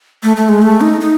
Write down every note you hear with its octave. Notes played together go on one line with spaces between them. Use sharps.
A3
A3
G#3
A3
D#4
D#4